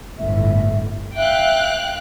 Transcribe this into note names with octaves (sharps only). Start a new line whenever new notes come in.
G1 A2 E5
E5 F5 G5 F#6